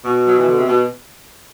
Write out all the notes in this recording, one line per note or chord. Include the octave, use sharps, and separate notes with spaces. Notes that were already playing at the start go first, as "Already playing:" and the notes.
B2
F#3
E3
D3
C3
B2